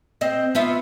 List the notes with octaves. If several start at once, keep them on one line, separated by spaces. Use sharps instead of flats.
C4 D#5
B3 F4 E5